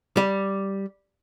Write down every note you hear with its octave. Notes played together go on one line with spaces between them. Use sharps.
G3